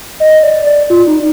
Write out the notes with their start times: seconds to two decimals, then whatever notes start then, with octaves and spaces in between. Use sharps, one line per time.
0.20 D#5
0.43 D5
0.67 D5
0.90 F4
1.07 D#4